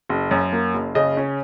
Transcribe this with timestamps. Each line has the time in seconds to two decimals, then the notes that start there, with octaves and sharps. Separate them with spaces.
0.09 F#1
0.31 F#2
0.53 A#3
0.74 F#1
0.95 C#3 D#5
1.17 C#4